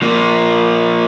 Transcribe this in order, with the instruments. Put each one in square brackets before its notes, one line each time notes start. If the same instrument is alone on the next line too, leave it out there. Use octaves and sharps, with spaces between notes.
[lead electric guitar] F3 A#3